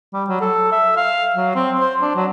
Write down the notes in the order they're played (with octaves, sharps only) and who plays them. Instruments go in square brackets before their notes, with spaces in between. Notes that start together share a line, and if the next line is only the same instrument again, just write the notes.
[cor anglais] G3
F#3
A4
E5
F5
F#3
C4
C5
D4
F#3